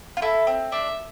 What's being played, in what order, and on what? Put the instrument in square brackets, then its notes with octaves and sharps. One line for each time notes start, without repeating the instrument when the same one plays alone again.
[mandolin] F4
[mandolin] E4 [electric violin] A4
[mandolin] C4
[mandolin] D4 [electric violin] E5